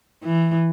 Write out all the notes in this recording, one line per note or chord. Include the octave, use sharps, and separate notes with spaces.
E3